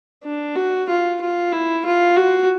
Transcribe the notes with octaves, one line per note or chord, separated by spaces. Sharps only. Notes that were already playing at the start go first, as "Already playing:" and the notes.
D4
F#4
F4
F4
E4
F4
F#4